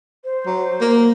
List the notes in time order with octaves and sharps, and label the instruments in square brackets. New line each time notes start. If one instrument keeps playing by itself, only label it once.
[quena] C5
[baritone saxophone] F#3
A#3